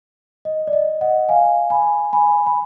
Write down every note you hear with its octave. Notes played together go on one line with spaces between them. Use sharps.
D#5
D5
D#5
D#5 F#5
F5 G#5
G#5 B5
G#5 B5
B5